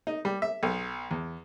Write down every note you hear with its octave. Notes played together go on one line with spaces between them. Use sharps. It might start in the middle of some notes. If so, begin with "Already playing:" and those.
D#4
G3
E5
B1
E2